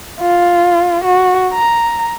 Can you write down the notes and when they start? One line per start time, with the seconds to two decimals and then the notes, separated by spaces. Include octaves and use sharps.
0.20 F4
1.04 F#4
1.53 A#5